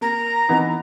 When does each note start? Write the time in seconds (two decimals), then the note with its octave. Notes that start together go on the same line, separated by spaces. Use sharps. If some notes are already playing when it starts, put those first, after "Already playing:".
0.01 A#3 A#5
0.49 E3 B3 D#4